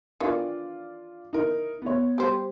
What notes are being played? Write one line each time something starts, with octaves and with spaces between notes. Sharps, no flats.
D#3 E3 D4 F4 D5
D#4 E4 A#4
B3 C#5
G3 G4 C5